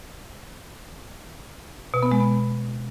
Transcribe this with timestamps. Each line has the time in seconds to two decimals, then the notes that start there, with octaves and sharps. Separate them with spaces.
1.94 B2
2.03 B3
2.12 G#3
2.20 B3